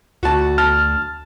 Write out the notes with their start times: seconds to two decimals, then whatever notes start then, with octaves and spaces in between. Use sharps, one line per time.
0.23 D2 F#4 A5
0.58 A5 F6